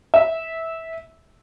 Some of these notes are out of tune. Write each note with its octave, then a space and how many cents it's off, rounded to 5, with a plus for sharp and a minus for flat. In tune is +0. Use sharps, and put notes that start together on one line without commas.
E5 -15